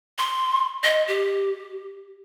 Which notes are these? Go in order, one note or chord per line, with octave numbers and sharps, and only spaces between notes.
C6
D#5
G4